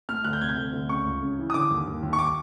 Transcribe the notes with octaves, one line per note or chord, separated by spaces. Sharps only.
A3 F6
D2 F#6
G6
C3 G#6
G6
D2
D2
C#3 C#6
C#2
C#3
E3
D#6
D3 D6
D#2
D#2
D#2
C#6
D6